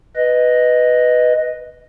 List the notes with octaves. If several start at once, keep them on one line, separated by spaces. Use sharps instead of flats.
B4 D#5